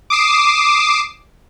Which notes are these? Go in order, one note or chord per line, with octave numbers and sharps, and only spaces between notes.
D6 D#6 C7 E7